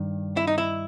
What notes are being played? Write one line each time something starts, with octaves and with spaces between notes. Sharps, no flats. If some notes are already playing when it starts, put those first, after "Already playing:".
Already playing: G2 D#3
E4
D#4
E4